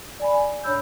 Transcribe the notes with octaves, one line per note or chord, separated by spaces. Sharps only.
D5 G#5 B5
A2 D4 C#5 B5 E6 G6